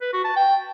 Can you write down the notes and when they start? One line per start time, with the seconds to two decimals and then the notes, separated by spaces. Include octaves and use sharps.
0.01 B4
0.13 F#4
0.25 A5
0.36 G5